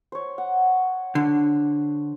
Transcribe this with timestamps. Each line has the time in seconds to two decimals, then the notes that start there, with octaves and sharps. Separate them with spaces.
0.12 C5 C#5
0.38 F#5
1.15 D3